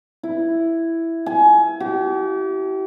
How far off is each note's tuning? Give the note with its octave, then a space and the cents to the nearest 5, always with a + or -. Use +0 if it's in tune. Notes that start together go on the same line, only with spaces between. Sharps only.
E4 +5
G#5 +25
G4 -40